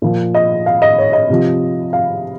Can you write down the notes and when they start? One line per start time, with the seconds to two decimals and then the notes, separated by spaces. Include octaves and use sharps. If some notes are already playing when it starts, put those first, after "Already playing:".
0.02 A#2 F3
0.35 D#5
0.66 F5
0.82 D#5
0.98 C#5
1.13 D#5
1.30 C3 F3
1.93 F5